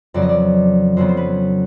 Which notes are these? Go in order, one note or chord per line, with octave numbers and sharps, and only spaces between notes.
F2 C#3 F#3 B3 D5
D#5
D5
F2 C#3 F#3 B3 C5
C5
B4